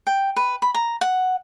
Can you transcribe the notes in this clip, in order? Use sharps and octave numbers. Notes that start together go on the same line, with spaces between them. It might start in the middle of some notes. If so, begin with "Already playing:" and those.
G5
B4
B5
A#5
F#5